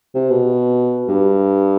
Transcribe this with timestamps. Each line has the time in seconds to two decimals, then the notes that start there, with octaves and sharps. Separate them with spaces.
0.15 C3
0.30 B2
1.08 G2